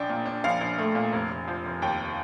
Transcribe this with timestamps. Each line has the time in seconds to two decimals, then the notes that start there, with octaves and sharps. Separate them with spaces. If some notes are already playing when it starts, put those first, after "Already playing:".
Already playing: A#1 D4 G5
0.09 A#2
0.26 D4
0.44 A#1 F5
0.61 A#1
0.78 A3
0.95 A#2
1.12 F1
1.31 F1
1.48 F3
1.66 F1
1.82 D#2 G5